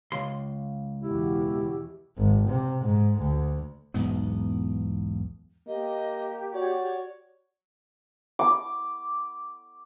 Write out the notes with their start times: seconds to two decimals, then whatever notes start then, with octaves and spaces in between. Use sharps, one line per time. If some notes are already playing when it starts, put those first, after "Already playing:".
0.12 C#2 C6
1.02 E2 B2 E4 G4
2.18 G#1
2.47 C3
2.82 G#2
3.18 D2
3.94 B1 E2 G#2 B3
5.67 A#3 G4 D#5
6.54 F#4 C#5 D5
8.39 D6